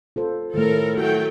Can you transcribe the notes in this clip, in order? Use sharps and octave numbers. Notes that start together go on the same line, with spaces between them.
F4 A4 C5
A2 D#3 A3 A4 A#4
F#3 A3 E4 F#4 G5